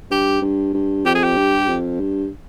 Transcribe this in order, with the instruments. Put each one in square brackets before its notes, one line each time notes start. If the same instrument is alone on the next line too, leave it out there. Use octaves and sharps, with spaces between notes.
[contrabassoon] G2 [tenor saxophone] G4
[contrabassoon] G2
G2
[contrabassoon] F2 [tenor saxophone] G4
[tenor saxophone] G#4
G4
[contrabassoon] G2
F2
G2